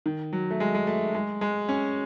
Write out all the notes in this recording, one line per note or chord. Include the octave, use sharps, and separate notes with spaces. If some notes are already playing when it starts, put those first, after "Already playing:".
D#3
F#3
A3
G#3
G#3
A3
G#3
G#3
C#4